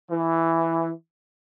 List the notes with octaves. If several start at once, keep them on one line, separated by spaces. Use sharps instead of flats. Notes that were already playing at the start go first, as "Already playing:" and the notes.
E3